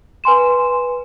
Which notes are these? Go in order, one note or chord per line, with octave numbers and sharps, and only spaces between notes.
B4 G#5 C6 E7